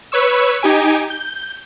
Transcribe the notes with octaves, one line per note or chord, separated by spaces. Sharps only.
B4 C#5 C#6 E6
D#4 G4 G#5 D7
G6